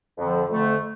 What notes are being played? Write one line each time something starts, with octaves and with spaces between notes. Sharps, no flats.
F2 D3 F3
F2 D3 A3